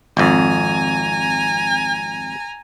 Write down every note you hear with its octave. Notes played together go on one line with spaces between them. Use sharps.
G#1 F2 G#5 A#5